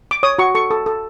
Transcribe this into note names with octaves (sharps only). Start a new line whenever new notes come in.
D6
C#5 D#6
F#4 C#6
A4 C#6
A4
A4